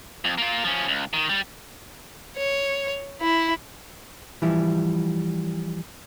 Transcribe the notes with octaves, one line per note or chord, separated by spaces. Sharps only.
F2
A#3 F4
F3 C#4
C#2
D#3
G3
C#5
E4
E3 F3 G3 E4